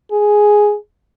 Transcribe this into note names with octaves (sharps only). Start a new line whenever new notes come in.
G#4